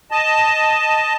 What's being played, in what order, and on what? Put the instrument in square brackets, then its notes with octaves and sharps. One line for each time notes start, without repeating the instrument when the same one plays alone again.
[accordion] D#5 A5